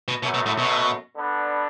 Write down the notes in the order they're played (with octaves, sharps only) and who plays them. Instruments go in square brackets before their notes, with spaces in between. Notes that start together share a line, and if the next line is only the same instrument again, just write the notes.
[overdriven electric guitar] B2
[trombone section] F#2 F#3 A3 [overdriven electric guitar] B2
[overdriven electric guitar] B2
A2
B2
[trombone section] D3 B3 D4 B4